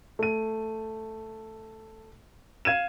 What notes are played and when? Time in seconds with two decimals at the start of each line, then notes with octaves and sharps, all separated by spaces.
0.19 A3 D#7
2.65 F5 G#6 D#7 E7